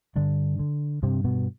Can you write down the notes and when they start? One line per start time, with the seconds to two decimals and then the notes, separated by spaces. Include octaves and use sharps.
0.16 G2 D3 D4
0.59 D3
1.03 G2 C3 C4
1.24 B2 B3